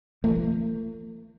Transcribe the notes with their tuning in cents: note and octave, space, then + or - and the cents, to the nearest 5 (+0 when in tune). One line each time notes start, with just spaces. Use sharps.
F3 -40 A3 +40